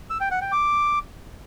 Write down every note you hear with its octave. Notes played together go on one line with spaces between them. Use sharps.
E6
G5
F#5
G5
D6